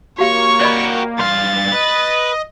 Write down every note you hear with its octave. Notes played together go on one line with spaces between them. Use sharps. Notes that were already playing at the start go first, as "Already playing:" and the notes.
A#3 F#4 G4 C#5 F5 C#6
F#4 G4 D5 D#5 B5
G2 F5 C6 A6
B4 D#5